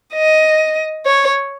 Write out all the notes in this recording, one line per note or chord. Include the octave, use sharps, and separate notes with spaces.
D#5
C#5